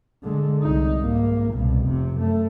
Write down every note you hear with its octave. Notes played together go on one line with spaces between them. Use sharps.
D3 G#3
C2 D#4
G#1 A#3
C2 B2
F1 C3
F#2 A3